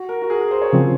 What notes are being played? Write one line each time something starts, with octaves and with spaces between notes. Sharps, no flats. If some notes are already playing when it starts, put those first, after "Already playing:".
Already playing: F#4
A#4
F#4
G#4
A#4
C5
C#5
C#3 F3 C4